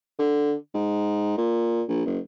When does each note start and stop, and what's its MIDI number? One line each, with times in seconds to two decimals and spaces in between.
0.19 0.54 50
0.74 1.36 44
1.38 1.82 46
1.88 2.02 34
2.05 2.19 30